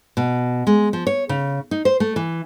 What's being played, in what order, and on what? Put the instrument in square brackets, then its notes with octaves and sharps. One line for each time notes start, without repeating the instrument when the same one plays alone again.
[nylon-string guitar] B2
G#3
F3
C#5
C#3
D#4
C5
A3
E3